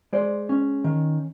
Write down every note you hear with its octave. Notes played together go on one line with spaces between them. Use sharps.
G#3 C5 D5
C#4
D#3